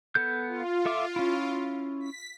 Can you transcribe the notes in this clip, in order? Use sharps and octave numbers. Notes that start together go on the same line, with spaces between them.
B3 A4 G6
F4
A4 E5 D6
C#4 E4
B6